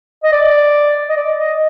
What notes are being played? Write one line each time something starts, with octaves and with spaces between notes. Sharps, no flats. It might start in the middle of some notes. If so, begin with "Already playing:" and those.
D#5
D5
D#5
D5
D#5